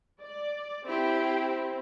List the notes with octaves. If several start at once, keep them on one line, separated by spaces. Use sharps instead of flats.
D5
C4 E4 G4